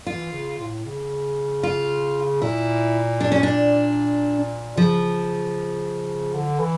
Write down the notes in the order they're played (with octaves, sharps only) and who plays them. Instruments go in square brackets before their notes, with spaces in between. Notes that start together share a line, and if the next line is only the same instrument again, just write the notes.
[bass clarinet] E3 [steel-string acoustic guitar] F4
[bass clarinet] C#3
A2
C#3
[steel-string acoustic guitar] F4
[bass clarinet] A#2 [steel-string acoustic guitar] E4
[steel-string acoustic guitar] D4
C#4
D4
[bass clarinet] C#3 [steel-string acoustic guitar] F3
[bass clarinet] D3
E3